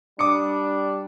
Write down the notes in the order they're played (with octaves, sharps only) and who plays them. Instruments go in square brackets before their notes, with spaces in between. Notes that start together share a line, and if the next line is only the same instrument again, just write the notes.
[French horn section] G3 D4 [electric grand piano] D6 D#6 C#7